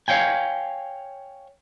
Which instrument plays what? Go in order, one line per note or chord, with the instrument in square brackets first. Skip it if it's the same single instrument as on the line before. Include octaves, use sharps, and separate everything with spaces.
[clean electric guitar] C#5 F5 G5 G#5